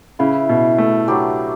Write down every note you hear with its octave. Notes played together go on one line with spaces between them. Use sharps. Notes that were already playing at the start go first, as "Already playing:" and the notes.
C#3 E4 B4 E5
B2
A3
F#3 B3 D4 G4